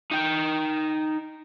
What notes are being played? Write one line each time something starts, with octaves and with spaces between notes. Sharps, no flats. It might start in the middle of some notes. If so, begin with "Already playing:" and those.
D#4 G5